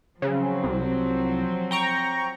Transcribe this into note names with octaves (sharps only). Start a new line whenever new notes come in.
C#3 F3 F#3 C4
C2
G5 A#5 C#6